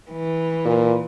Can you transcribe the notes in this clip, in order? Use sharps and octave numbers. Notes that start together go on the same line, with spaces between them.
E3
A#2